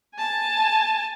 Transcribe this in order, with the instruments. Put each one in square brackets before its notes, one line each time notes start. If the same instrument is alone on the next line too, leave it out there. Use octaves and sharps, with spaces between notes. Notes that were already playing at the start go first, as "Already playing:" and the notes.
[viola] G#5 A5